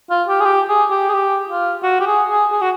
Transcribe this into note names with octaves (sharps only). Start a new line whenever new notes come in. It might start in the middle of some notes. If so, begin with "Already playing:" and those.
F4
G4
G#4
G4
G#4
G4
G#4
G4
F4
F#4
G4
G#4
G#4
G#4
F#4